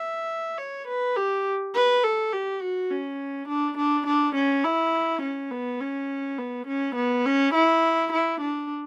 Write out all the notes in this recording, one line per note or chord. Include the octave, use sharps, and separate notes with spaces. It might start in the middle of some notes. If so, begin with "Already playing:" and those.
Already playing: E5
C#5
B4
G4
B4
A4
G4
F#4
C#4
D4
D4
D4
C#4
E4
C#4
B3
C#4
B3
C#4
B3
C#4
E4
E4
D4